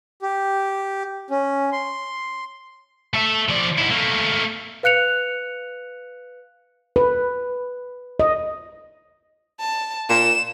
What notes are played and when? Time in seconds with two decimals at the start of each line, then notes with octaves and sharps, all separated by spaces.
0.22 G4
1.30 C#4
1.72 C6
3.14 A3 E5
3.49 F3 D5
3.78 G#2 E4
3.91 A3 A#3
4.83 B4 F5 F#6 C#7 F7
6.96 B4
8.20 D#5
9.60 A5
10.09 A#2 E7